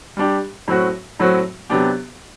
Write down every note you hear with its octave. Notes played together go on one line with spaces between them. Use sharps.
G3 D4 G4
A2 F#3 C4 F#4
A2 F#3 C4 F#4
C3 F#3 B3 D4 G4